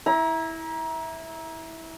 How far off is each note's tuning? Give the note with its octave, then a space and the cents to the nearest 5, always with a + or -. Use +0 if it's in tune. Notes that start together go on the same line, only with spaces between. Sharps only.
E4 -15 A#5 +25